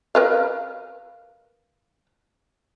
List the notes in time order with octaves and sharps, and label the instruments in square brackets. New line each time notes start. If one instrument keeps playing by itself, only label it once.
[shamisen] A#4 B4 F5